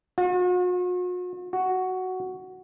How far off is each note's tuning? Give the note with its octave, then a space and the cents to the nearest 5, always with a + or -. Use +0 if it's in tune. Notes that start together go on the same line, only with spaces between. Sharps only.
F#4 -45
F#4 +5